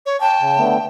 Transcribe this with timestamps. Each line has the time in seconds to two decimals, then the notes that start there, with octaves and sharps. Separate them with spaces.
0.06 C#5
0.21 G5 A5
0.41 C#3
0.58 D3 A3 B3